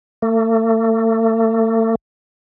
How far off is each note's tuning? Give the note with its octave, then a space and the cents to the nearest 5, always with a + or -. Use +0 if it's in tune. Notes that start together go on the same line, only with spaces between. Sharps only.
A3 +40